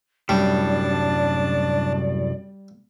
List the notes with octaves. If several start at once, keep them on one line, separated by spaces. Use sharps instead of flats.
C2 F#2 A2 G3 D4 D5 A5